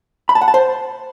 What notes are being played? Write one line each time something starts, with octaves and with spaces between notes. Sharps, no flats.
B5
A5
F#5
A5
C5